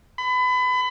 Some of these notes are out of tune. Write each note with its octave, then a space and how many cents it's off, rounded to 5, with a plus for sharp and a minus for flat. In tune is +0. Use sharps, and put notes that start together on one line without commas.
B5 +30